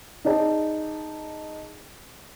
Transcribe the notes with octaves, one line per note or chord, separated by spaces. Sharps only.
D#4 G#4 D5 A5